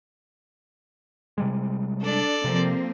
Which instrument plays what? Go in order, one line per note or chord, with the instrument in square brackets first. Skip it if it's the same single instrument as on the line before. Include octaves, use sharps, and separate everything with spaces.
[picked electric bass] C3 G3 G#3
[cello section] D4 [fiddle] A4 D5
[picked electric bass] C3 [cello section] F3 A#3 C4